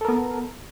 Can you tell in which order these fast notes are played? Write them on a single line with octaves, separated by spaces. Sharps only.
A4 A#4 B3